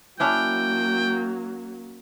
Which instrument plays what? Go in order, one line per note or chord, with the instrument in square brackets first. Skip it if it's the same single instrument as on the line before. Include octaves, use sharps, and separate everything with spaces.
[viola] F#3 A#3 [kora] C#4 D4 E4 [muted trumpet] G5